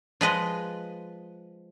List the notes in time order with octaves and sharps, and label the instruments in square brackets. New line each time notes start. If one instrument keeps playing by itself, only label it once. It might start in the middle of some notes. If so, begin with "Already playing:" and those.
[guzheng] F3 G#3 B4 D#5